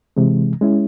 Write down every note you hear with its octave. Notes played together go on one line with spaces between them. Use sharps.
C3 E3 G#3
G#3 C#4 E4